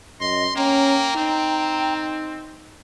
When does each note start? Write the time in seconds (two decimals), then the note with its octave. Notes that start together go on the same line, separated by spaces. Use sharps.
0.20 F#2 D#5 C6 A#6
0.55 A#3 C#4 G5 A#5
1.16 C4 D#4